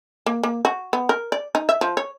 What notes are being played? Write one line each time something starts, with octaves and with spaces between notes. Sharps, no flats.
A#3
A#3
F#4
B3
A#4
D5
D#4
E5
F3
C#5